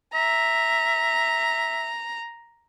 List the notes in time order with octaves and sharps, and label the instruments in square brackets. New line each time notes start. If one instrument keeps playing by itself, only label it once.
[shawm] E5 [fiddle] A#5